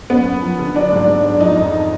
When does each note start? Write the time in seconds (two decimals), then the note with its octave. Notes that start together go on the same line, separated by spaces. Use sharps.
0.10 F#2 B3
0.26 F#2
0.42 F3
0.59 D3
0.75 F#3 D4
0.92 G#2
1.07 G#2
1.25 F#3
1.41 F3 D#4
1.56 F2